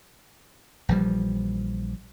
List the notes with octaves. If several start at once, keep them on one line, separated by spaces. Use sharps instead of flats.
A#1 E3 F3 G3